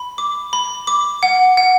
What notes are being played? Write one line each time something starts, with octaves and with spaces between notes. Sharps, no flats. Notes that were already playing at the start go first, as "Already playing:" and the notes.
Already playing: B5
D6
B5
D6
F#5
F#5